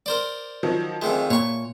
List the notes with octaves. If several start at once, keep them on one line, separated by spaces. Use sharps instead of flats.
A#4 C5 D5
D#3 F3 F#3
F2 D#3 G#3 A3
A#2 C#5 C#6